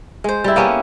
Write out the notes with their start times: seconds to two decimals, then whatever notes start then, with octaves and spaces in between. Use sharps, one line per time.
0.24 G#3 C5
0.44 G3 E4
0.56 A#3 B3 C#4 G4